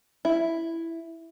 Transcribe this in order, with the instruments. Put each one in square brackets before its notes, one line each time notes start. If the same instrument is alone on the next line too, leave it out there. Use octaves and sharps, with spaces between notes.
[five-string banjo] E4